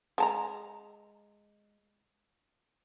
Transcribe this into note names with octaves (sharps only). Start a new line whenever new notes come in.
G#3 A5 A#5